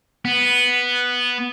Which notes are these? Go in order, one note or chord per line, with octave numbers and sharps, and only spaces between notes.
B3